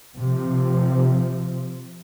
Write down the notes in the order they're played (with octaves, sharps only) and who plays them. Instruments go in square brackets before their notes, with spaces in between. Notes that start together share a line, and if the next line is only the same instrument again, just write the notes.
[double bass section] C3 F3